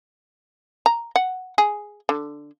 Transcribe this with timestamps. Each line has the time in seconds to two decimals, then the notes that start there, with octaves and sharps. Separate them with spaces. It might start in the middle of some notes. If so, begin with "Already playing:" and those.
0.86 A#5
1.16 F#5
1.58 G#4
2.09 D3